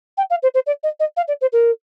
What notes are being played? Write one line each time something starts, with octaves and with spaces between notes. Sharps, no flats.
G5
F5
C5
C5
D5
D#5
D#5
F5
D5
C5
A#4